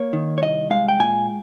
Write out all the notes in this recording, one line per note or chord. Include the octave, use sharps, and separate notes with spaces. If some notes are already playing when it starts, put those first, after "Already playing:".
Already playing: A#3 C#5
D#3
C#5
C2 D#5
G#3 F5
G5
A#2 G#5